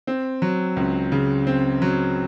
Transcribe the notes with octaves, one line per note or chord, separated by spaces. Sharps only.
C4
F#3
C#2
C#3
C4
F#3